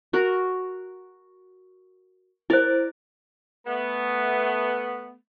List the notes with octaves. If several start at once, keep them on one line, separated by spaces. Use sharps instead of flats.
F#4 A#4
E4 A#4 C5 D5
A3 B3